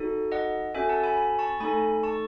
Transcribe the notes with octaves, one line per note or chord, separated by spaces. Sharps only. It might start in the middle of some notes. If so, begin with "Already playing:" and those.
Already playing: D#4 F#4 A4
D#5 F#5
C#4 F#4 A4 E5 G#5
F#5 A5
G#5 B5
G#5 B5
A5 C#6
A3 D#4 A4 G#5 B5
A5 C#6